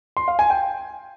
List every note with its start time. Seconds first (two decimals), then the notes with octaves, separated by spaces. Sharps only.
0.17 C6
0.28 F5
0.39 G#5
0.50 G5